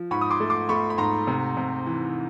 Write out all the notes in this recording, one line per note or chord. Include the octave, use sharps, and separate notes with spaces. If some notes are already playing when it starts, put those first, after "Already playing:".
Already playing: F3
G#2 B5 C#6
D#6
C6 D6
A3
C6 D6
A3 B5 C#6
B5
G#2 A#5 C6
C3
C3
E3